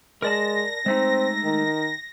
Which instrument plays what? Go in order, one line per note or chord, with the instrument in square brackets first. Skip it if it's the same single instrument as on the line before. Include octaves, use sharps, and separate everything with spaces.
[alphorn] G#3 [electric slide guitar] A#4 D5 A5 [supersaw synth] A#6
[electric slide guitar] G#3 A3 D#4 [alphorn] C4
[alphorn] D#3